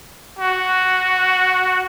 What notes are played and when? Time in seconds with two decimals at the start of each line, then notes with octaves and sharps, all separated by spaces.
0.39 F#4